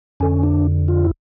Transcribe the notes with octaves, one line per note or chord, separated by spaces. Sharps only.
F2 D3 C#4
D4
F4
E4